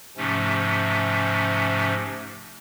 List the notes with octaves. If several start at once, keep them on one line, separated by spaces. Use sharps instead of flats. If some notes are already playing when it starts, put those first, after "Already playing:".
G#2 C3 F3 A3 C#4